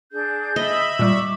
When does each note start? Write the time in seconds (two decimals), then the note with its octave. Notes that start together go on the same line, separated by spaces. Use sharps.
0.11 D4 G#4 G6
0.56 D#5 E5 B5
0.99 A#2 G3 C#6 D6